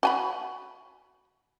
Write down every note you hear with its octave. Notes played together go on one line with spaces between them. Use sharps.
F#4 G#5 B5